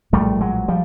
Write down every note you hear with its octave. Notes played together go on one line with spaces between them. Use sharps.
A#1 A2 G3 A3
F#3 G#3
F3 G3